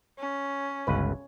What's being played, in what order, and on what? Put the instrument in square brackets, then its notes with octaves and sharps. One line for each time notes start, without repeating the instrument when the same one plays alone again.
[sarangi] C#4
[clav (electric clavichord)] G1 C#2 B4